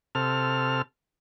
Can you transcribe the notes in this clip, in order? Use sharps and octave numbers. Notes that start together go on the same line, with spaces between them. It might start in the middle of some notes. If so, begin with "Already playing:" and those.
C3 A4 F6